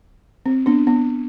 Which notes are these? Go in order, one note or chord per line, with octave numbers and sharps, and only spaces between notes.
C4
B3 D4
B3